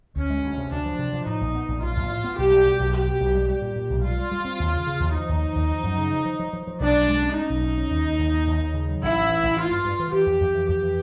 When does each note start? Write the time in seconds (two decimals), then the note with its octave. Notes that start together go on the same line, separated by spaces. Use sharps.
0.16 D2 C#4
0.30 G#3
0.44 D2
0.58 C3
0.72 D2 D4
0.86 F3
0.99 C3
1.13 F3
1.26 A2 D#4
1.41 A#1
1.55 B3
1.68 A#1
1.82 A#1 F4
1.97 A#1
2.10 A2
2.24 B3
2.38 B1 G4
2.52 G3
2.66 B2
2.80 B1
2.93 B2 G4
3.07 B2
3.20 B1
3.35 G3
3.48 G3 G4
3.62 A#2
3.76 A#2
3.90 B1
4.03 G3 F4
4.18 G3
4.32 G3
4.45 C4
4.60 D#2
4.73 C#3
4.87 C#3
5.00 D#2
5.15 F3 D#4
5.29 D#2
5.42 F3
5.56 D#2
5.70 F3
5.83 F#2
5.98 C#3
6.12 F3
6.25 F3
6.40 F3
6.53 F3
6.67 F3
6.80 B1 D4
6.95 B1
7.08 G#3
7.22 C#4
7.36 C#4 D#4
7.50 B1
7.64 C#4
7.78 C#4
7.91 D#2
8.05 D#2
8.19 D#2
8.33 D#2
8.47 D#2
8.60 D#2
8.74 C#3
8.89 F#3
9.02 A1 E4
9.16 A1
9.30 E3
9.43 A1
9.57 E3 F4
9.71 G2
9.85 G2
10.00 E3
10.13 E3 G4
10.26 F2
10.41 F2
10.54 E3
10.68 F2 G4
10.82 E3